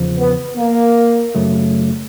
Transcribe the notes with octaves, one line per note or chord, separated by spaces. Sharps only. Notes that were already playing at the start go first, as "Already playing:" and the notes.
Already playing: E2 C#3 F3
B3
A#3
F#2 C#3 F#3 A3